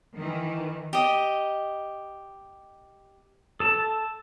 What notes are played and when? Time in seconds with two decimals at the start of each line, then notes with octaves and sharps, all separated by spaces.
0.15 D#3 E3
0.93 G4 D#5
3.60 A4 A5